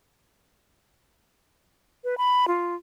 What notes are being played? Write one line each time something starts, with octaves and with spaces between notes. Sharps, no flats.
B4
B5
F4